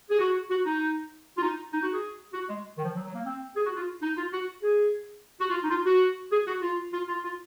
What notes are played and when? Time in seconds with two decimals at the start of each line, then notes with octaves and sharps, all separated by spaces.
0.10 G#4
0.19 F#4
0.50 F#4
0.65 D#4
1.37 F4
1.42 D#4
1.73 D#4
1.83 F#4
1.93 G#4
2.34 F#4
2.49 G#3
2.78 D#3
2.84 F3
2.95 F#3
3.05 F#3
3.15 A#3
3.26 C4
3.56 G#4
3.66 F#4
3.76 F4
4.02 D#4
4.17 F4
4.33 F#4
4.63 G#4
5.40 F#4
5.50 F4
5.64 D#4
5.70 F4
5.86 F#4
6.32 G#4
6.47 F#4
6.62 F4
6.93 F4
7.08 F4
7.24 F4